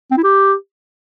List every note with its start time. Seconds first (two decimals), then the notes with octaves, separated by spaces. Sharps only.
0.11 C4
0.17 E4
0.23 G4